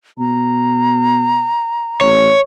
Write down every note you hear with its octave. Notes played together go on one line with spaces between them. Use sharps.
B2 A#5
A1 C#5